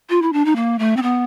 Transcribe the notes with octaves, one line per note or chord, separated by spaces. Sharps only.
F4
E4
D4
D#4
A#3
A3
C4
B3